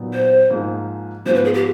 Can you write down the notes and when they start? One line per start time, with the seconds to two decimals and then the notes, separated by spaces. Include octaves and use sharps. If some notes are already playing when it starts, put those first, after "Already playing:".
Already playing: A#2 F#3 B3 D#4
0.13 C5
0.50 G#2 F3 A#3 D#4 G#4
1.25 G#2 F3 G#3 B3 C5
1.35 B4
1.45 G#4
1.54 G4